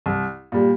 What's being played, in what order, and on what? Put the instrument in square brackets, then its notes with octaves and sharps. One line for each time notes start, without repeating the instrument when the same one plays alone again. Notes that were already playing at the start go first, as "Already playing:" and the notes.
[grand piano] C2
A#2 G3